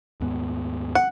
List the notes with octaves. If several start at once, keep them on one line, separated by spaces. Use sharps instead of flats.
D#2 G#2 B3
F#5